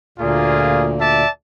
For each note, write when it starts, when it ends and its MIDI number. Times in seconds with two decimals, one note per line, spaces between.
0.18 1.24 38
0.18 1.24 46
0.18 0.88 58
0.18 0.88 65
0.18 0.88 68
0.98 1.29 74
0.98 1.29 76
0.98 1.29 81